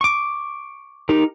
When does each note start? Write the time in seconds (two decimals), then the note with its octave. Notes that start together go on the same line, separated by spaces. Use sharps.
0.01 C#6 D6
1.09 D#4 G4 A#4